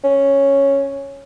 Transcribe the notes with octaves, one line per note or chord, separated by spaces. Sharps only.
C#4